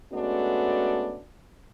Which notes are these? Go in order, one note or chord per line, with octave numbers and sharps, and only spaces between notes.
G#3 A3 B3 C#4 D4 F#4